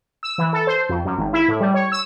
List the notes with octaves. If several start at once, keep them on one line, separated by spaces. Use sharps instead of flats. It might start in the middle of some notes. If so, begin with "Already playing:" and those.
E6
E3
A4
C5
F2
F#2
G#1
E4
A2
G3
C#5
E6